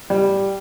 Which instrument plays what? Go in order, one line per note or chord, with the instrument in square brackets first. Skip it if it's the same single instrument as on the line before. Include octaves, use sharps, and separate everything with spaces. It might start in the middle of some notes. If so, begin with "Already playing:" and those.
[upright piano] G3